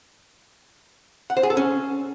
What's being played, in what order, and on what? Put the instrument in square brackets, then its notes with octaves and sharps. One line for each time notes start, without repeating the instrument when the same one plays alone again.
[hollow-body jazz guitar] F#5
C5
G#4
A4
C#4